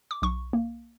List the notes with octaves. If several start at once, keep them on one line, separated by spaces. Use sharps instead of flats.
D6
B1 C#6
A#3